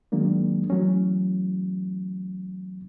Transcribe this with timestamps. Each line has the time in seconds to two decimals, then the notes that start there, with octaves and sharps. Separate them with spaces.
0.12 D#3 F#3 G#3 A#3 D4
0.70 E3 F#3 A3 C#4